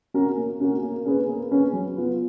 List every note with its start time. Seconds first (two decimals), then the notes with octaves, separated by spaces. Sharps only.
0.14 C#4 F#4 A#4
0.37 A#3
0.60 C#4 F#4 A#4
0.83 A#3
1.05 C#4 G#4 B4
1.28 A#3
1.51 C#4 G#4 B4
1.73 F#3
1.96 B3 F4 B4